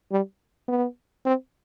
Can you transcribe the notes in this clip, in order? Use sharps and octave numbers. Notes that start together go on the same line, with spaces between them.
G3
B3
C4